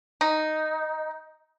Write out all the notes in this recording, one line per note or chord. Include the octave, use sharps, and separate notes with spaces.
D#4